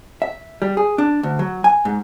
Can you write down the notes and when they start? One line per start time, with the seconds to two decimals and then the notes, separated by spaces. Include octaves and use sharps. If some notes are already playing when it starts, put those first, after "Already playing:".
0.22 E5
0.62 G3
0.77 G#4
0.98 D4
1.23 D2
1.39 F#3
1.64 G#5
1.85 G#2